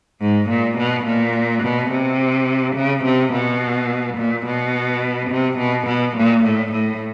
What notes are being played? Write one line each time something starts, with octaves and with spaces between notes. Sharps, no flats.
G#2
A#2
B2
A#2
B2
C3
C#3
C3
B2
A#2
B2
C3
B2
B2
A#2
A2
A2